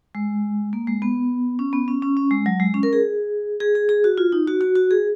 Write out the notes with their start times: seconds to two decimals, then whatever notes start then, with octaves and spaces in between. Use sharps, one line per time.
0.15 G#3
0.73 A#3
0.87 G#3
1.02 B3
1.59 C#4
1.73 B3
1.88 C#4
2.02 C#4
2.17 C#4
2.31 G#3
2.46 F#3
2.60 G#3
2.74 C#4
2.83 A#4
2.93 G#4
3.60 G#4
3.75 G#4
3.89 G#4
4.04 F#4
4.18 F4
4.32 D#4
4.48 F#4
4.61 F#4
4.75 F#4
4.91 G#4